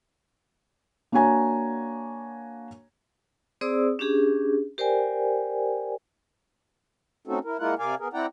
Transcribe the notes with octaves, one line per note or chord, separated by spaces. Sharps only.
A#3 D4 F#4 C#5 G#5 A#5
C4 G#4 C5 D5 D#6 E6
C#4 D4 G4 G#4
G4 A#4 C5 D5 G5 G#5
A3 C4 C#4 D#4 F#4 A4
E4 A#4
G#3 A#3 E4 F4 A#4 F#5
C3 A#4 D5 F5 G#5
B3 G#4 A#4
C4 E4 D5 F#5 G5 A#5